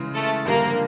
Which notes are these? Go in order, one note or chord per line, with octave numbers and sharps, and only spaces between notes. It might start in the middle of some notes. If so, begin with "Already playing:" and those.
Already playing: C#3 E3 G#3
A3 A4
F2 D3 G3 A#3 A#4